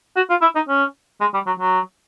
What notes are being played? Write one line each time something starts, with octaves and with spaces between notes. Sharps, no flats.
F#4
F4
E4
D#4
C#4
G#3
G3
F#3
F#3